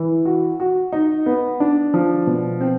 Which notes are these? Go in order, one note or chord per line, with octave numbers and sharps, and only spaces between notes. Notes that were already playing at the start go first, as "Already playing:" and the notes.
Already playing: E3
F#4
F#4
D#4
B3
D4
F3
B2
C4